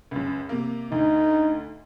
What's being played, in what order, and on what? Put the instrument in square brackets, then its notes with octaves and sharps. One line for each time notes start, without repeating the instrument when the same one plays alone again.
[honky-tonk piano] C#2 F#2
C3 A#3
[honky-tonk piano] D2 [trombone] D#4